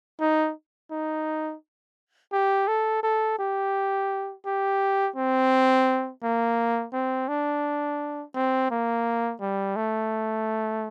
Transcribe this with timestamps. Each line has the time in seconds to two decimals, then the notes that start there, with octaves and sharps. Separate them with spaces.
0.20 D#4
0.91 D#4
2.33 G4
2.68 A4
3.03 A4
3.39 G4
4.46 G4
5.16 C4
6.23 A#3
6.93 C4
7.28 D4
8.35 C4
8.71 A#3
9.41 G3
9.76 A3